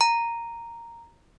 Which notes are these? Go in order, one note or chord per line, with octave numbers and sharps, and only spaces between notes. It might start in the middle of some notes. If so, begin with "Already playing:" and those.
A#5